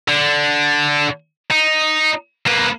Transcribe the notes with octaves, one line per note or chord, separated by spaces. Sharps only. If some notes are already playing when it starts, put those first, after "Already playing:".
D3
D#4
A#3 B4